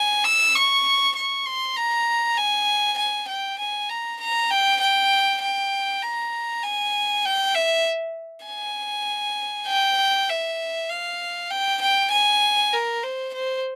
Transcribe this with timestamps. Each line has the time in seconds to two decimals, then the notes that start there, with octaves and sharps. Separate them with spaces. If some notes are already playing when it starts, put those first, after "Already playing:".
Already playing: G#5
0.24 E6
0.55 C#6
1.16 C#6
1.46 C6
1.77 A#5
2.37 G#5
2.98 G#5
3.28 G5
3.59 G#5
3.89 A#5
4.21 A#5
4.50 G5
4.81 G5
5.42 G5
6.03 A#5
6.63 G#5
7.25 G5
7.55 E5
8.46 G#5
9.68 G5
10.29 E5
10.89 F5
11.51 G5
11.81 G5
12.12 G#5
12.73 A#4
13.03 C5
13.34 C5